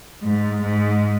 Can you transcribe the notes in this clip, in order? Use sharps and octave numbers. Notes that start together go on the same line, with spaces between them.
G#2
G#2